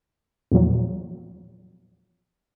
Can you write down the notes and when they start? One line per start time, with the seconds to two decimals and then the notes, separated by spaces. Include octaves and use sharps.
0.52 E2 A#2 F3 F#3